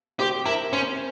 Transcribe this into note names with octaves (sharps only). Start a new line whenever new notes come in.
G4 C5
E4 A#4
C#4 C5